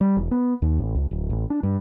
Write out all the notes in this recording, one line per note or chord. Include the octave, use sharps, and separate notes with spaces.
G3
E1
B3
D#2
A1
C#2
D1
A1
D4
G2